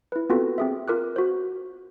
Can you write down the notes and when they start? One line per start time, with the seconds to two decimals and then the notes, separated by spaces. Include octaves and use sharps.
0.12 E4 B4
0.30 B3 C4 F4 F#4 A4
0.58 C4 G#4 E5
0.88 F4 A#4 D6 F#6
1.16 F#4 C5